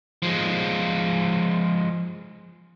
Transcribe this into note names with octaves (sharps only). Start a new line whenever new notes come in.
F3 G#3